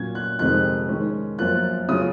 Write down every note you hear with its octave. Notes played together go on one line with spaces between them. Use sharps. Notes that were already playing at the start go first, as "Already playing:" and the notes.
Already playing: A#2 F#3 C#4 G#6
F#6
F2 C3 D#3 G#3 C4 F#6
D#3 G#3 C#4
F#2 F3 A#3 F4 F#6
C#3 F#3 C#4 F4 D#6